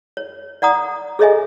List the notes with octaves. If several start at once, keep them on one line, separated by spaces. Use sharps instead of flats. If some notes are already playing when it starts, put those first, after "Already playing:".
C#5
D5 F#5 A#5 D#6
G#4 A4 C#5 D#5 E5 G#5